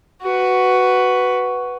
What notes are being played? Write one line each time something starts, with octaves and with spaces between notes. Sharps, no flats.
F#4 B4